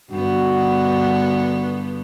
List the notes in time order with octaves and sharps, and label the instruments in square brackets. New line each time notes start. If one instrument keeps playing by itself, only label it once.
[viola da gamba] G2 D3 B3 [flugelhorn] F#4